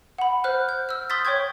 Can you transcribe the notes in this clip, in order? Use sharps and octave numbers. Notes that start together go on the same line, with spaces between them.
F#5 B5
C5 F6 F#6
G6
E6 F6
C6 D#6 G6 A6 B6
C#5 G5 C#6 G6 G#6